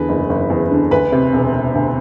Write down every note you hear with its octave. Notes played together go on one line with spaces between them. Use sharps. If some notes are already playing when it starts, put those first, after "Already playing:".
Already playing: E2 D3 B4
F#1
F#1
E2
D3
D2 B4 B5
C3
E1
E1
D2